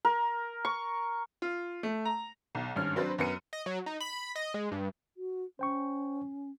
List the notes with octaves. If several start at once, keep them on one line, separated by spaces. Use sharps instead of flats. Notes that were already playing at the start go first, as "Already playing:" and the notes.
A#4
C#6
F4
A3
A#5
B1
G#1 G2 C#4 F6
F#3 C4 D4 B4 C5
F#2 B3 C#7 D#7
D#5
F#3
D#4
B5
D#5
G#3
G2
F#4
C#4 C5 G5 C#6